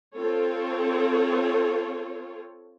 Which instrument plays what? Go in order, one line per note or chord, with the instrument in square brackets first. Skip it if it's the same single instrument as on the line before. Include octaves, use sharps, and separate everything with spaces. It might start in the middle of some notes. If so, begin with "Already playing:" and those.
[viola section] C4 F4 A4 C#5